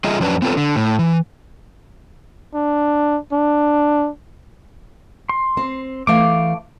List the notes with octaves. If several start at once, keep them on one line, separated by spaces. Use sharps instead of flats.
G3 F4 G#4 D#5 E5
F2 F#3 C#4 D4 B4
B3 C4 F4 G#4 A4 B4
D3
A2
E3
D4
D4
C6
C4
E3 A3 F5 D6